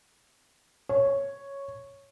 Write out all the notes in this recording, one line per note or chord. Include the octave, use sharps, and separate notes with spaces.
C#5